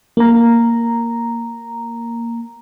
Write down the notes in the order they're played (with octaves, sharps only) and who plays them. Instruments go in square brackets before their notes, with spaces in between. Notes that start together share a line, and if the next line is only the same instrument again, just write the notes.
[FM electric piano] A#3 A#5